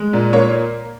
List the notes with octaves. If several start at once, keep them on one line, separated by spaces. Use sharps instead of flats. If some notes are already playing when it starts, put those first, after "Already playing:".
Already playing: G#3
A#2
A#3 C#5